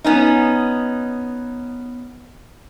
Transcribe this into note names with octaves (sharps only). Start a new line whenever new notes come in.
B3 C#4 D#4